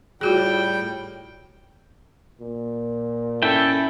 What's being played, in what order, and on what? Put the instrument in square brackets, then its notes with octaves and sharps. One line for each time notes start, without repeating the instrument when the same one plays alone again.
[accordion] A2 G3 G5 [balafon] F4 F#4 G#4
[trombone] A#2
[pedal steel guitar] C#4 E4 G5 [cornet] A4